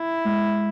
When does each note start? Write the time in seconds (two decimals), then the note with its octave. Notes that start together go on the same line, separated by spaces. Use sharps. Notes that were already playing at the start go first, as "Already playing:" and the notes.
Already playing: E4
0.25 G#3